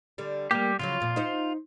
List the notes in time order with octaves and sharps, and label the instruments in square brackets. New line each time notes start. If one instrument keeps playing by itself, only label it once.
[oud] D3 G3
[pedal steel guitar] G3 G4 [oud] A#3
[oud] C#3 F3 F#3 [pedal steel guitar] F4
[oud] F2 A#2
D#4 C5